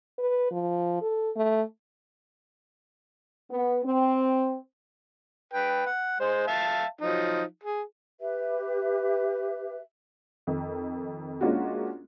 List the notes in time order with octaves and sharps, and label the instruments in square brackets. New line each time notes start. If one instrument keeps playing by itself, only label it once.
[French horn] B4
F3
A4
A3
[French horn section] B3
C4
[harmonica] B4 G5
F#5
G#3 C5
E5 F5 A5
F3 F#3 D#4
G#4
[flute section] G4 B4 E5
[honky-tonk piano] F2 D#3
G#3 A#3 C#4 D4 F4 F#4